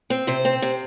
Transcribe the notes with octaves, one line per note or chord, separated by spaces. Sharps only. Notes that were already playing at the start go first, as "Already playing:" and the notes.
C4
C3 C5
C4
C3